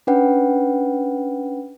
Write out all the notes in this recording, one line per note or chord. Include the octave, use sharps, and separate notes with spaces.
C#4 D4 B4 F#5 G5